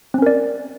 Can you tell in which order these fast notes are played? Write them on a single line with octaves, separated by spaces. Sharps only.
C4 C#4 A#4 D5